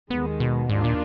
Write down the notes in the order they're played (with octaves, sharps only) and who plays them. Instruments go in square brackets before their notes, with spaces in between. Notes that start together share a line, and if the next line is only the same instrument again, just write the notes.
[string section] D#2 D#3 G#3 [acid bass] B3
[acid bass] B2
[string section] D#2 D#3 A#3 D4 F4 [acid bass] G#2
[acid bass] A#2